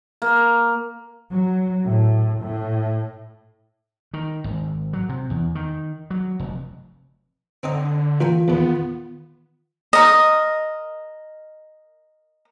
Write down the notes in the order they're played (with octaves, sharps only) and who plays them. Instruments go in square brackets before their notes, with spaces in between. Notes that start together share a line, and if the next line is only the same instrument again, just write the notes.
[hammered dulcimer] A#3
[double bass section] F#3
A2
A2
[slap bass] D#3
G#1
F#3
C3
E2
D#3
F#3
F1
[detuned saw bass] D3 [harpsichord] C4 D#4 D#5
[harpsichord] A#2 A#4 G#5 [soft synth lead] E3 [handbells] F4
[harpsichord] E2 A#2 [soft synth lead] D#3 [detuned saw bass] B3
[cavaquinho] A#4 D#5